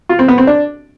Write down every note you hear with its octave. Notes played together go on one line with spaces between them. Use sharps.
F4
C4
B3
C4
D4